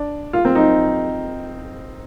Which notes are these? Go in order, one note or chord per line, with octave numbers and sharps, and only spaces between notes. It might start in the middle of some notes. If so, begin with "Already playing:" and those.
Already playing: D4
F4
C4
D#4